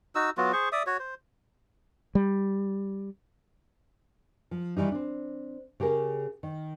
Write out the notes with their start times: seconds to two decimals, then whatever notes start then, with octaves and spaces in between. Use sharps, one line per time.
0.15 D#4 F#4 E6
0.37 F#3 B3 F4 F#4
0.53 G#4 C5 C#6
0.72 D5 E5 D#6
0.86 F#4 C#5
0.99 C5
2.15 G3
4.51 F3
4.77 D#3 E3 G3 D#4
4.92 C4 D4
5.80 C#3 G4 G#4 A#4
6.43 D#3